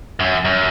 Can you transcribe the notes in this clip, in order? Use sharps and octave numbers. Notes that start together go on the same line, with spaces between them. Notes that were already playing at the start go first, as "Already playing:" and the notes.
F#2
F#2